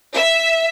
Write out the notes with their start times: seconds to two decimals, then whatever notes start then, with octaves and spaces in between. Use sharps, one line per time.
0.16 E5